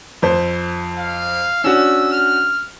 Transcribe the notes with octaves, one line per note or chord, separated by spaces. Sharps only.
F2 C5
F5
C#4 D4 F#4 E6
F6